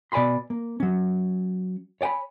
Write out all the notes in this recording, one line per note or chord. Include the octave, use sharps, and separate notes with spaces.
B2 D5 G#5 B5 C6
A#3
F#3 C#4
C#5 D5 G5 G#5 B5